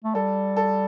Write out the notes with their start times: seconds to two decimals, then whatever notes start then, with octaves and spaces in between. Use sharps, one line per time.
0.04 A3
0.15 G3 A4
0.57 A4